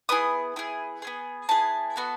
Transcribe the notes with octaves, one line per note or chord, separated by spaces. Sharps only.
B3 E4 G#4 D#6
B3 E4 G#4
B3 E4 G#4
B3 E4 G#4 A5
B3 F#4 A4